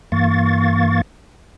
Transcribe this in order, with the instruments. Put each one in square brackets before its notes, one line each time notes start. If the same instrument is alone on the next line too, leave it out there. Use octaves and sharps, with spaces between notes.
[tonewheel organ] G2 E3 A#3 F5 C#6 A6